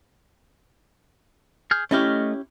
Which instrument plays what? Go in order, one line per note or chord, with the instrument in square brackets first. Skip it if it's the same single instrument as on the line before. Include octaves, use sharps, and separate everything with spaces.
[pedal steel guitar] G#4 F6 G6
[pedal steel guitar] A3 D#5 F6 [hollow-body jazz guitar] C#4 E4 G4